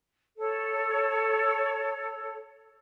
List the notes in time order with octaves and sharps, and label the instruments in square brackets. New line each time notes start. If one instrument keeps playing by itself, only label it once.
[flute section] A4 C#5